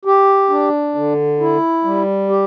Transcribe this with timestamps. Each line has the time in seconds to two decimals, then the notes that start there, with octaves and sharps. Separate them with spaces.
0.05 G4
0.50 D4
0.95 D3
1.40 E4
1.84 G3
2.29 G4